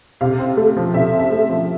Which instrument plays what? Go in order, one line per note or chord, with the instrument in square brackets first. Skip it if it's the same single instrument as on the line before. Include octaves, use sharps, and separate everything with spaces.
[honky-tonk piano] C3 F5
C4
A3
F3
C3 E5
C4
E5
A3
F3